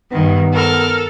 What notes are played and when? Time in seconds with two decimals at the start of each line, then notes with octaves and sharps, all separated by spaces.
0.12 G2 D#3 B3
0.53 A4 A#4 F6